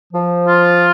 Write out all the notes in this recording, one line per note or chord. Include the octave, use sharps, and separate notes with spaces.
F3
F4